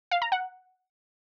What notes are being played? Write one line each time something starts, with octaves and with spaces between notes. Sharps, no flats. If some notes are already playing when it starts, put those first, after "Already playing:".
F5
A#5
F#5